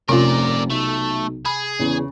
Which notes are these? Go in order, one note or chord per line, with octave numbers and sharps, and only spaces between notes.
F1 C3 C#4 F4 A#4 D5
B1 A3
G#4 B5
E2 C#3